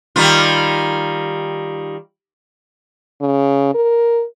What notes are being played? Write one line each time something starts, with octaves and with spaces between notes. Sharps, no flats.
D#3 G3 F4
C#3
A#4